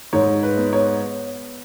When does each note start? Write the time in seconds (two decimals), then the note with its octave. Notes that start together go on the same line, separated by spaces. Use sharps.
0.13 G#2 C#5
0.43 B4
0.58 B3
0.73 C#5